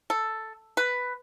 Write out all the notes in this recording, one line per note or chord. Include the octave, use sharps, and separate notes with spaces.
A4
B4